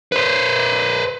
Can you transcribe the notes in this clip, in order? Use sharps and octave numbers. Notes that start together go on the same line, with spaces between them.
B4 C5